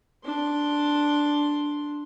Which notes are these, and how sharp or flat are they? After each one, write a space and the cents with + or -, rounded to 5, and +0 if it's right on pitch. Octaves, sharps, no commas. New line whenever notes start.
D4 +0 C6 +5